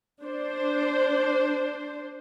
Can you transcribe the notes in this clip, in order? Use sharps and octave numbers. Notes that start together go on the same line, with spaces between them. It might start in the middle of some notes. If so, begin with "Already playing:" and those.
D4 C5